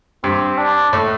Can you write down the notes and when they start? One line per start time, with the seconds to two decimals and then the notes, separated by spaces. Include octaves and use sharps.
0.24 G2 C4
0.58 D4
0.93 A2